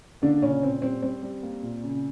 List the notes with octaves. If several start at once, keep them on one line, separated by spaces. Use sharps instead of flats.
D3 A#3 D4
A#2 C#3 C#4
A#2 C4
G3 C4
G3 C4
G3
A#3
A#2
C#3